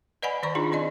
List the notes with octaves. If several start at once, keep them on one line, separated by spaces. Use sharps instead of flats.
B4 D5 D#5 F#5 G#5 B5
D#3 D5 A#5 C#6
D4 D#4 F4 G#4
C4 D#4 D5 D#5